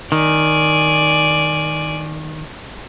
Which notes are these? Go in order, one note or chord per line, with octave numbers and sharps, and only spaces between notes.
D#3 D5 G#5